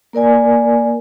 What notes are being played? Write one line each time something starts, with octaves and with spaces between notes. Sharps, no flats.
A#3 A#4 D5 G#5